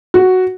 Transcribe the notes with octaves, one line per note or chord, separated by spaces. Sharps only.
F#4